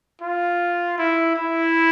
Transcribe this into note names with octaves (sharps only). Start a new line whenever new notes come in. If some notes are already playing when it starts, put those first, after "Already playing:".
F4
E4
E4